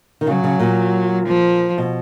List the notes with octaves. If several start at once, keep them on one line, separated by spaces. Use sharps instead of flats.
D#3
C#3 F#3
C#3
A#2
F3
B2